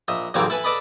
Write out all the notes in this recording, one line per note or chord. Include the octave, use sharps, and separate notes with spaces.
A#1 D#5 E5
A1 F#2 C#3 E3 A#3 C4
E4 A4 B4 G#5
A4 B4 D5 D#5 B5